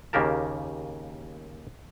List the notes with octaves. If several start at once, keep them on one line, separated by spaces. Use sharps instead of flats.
D#2 C#3 A#3 G4 A#4 A5